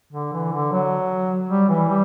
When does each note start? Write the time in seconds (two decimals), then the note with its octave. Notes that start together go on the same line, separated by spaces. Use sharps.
0.13 D3
0.33 E3
0.53 D3
0.72 F#3
1.49 G3
1.69 E3
1.89 G3